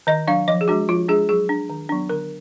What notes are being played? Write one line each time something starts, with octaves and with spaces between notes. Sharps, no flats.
D#3 D#5
F#3 D4 F5
F3 D#5
G#4
G#3 D4 F#4
F3 F4
G#3 D4 G#4
F#3 G#4
D4
D#3
F#3 B3 D4
D3 A#4